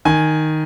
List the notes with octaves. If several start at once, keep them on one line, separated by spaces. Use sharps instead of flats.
D#3 G#5